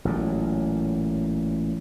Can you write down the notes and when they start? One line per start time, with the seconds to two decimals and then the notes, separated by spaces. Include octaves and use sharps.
0.05 A1 A#2 F#3